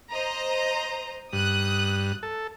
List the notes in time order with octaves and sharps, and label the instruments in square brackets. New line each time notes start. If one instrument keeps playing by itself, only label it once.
[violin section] C5 D#5 A#5
[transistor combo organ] G2 [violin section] D#6 F#6
[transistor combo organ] A4